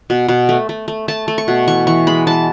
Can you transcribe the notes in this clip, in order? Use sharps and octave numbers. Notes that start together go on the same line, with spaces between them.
B2
B2
A3
A3
A3
A3 A5
A3
C#6
B2
E3 C#6
E3 C#6
G#3 B5
E3 A5